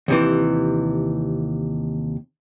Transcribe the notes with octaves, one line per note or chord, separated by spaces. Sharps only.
D#2 C3 E3